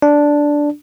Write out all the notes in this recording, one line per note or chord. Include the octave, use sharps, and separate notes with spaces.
D4